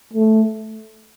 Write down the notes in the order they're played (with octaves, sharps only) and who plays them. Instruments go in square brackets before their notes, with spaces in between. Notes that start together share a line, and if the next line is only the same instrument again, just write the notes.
[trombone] A3